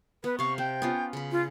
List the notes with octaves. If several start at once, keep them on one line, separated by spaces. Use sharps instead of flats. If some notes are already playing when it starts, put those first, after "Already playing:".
B3 B4
C3 F5 C#6
C4 G5
B3 C#4 F4
C#3 B5
F4